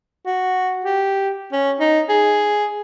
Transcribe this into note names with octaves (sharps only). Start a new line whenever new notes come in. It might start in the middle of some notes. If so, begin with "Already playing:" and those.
F#4
G4
C#4
D#4
G#4